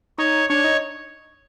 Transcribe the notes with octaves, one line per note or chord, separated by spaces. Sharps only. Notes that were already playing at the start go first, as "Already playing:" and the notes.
D#4 C#5
D4 C#5
D#4